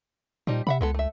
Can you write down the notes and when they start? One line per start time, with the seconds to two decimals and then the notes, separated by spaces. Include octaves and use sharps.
0.47 A#2 F3 G3 D#4
0.67 C3 E5 F#5 B5
0.81 C#2 G#3 B3 A4
0.94 A3 E5